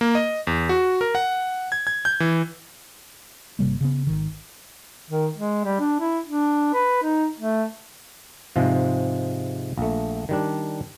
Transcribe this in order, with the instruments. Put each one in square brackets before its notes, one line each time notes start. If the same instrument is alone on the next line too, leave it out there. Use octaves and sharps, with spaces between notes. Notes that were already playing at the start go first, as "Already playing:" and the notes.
[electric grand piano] A#3
D#5
E2
F#4
A#4
F#5
G#6
G#6
G6
E3
[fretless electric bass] G1 C3 G3 A#3
C#3 B3
G#1 D#3
[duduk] D#3
G#3
G3
D4
E4
D4
B4
D#4
A3
[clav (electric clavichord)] G#2 C3 F3 G#3
A#1 A3
D#3 G3 D4